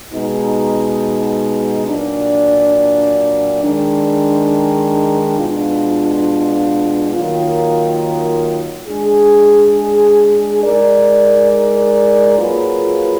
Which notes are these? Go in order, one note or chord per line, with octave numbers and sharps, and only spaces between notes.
B2 G#3 D#4
A#2 F#3 D4
D#3 G#3 D4
B2 G#3 D4 F4
D#3 F#3 A#3 F4
G#3 D4 G#4
G#3 D#4 A#4 D5
F#3 A#3 F4 G#4 B4